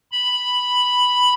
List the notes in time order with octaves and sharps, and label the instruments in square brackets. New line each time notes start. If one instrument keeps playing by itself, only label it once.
[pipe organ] B5